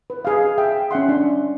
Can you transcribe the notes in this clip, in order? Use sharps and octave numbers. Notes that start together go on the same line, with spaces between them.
B4
G#4 F5
G#4 E5 G5
C#4 E5 F#5 C6
D4